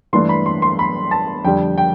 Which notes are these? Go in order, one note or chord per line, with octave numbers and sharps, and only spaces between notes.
G2 E3 A3 D4 C6
B5
C6
C6
B5
A5
F2 D3 G3 G5
G5